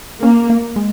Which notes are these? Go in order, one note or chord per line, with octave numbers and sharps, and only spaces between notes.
A#3 C#4
A#3
G#3